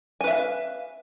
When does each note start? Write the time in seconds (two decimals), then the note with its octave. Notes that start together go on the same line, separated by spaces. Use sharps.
0.21 G#5
0.24 B4
0.27 E5
0.31 F5